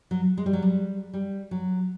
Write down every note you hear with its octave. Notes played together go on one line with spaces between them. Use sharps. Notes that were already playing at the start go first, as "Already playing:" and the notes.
F#3
G#3
G3
F#3
G3
G3
F#3